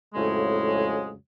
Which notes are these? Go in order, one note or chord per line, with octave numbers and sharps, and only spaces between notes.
F2 A2 C#3 F#3 G#3